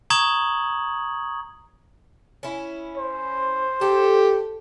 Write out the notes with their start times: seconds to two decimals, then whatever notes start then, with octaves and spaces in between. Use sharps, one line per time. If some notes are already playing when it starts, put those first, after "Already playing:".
0.10 A#5 C#6 D#6 G#6 F#7
2.43 C#4 E4
2.97 C5
3.81 G4 A4